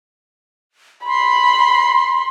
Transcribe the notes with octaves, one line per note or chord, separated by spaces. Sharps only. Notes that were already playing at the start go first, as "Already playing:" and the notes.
B5 C6